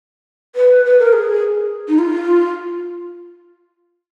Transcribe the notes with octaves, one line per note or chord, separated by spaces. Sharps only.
B4
B4
A#4
G#4
D#4
F4